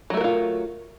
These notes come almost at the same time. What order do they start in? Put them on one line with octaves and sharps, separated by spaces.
F#3 A3 A#4 F#4 F4